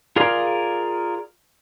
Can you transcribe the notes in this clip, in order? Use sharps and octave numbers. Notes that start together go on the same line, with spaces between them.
F4 G#4 A#4 D5 F5